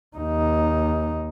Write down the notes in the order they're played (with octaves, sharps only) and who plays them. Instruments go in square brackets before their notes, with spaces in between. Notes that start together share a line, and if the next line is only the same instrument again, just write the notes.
[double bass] D#2 D#4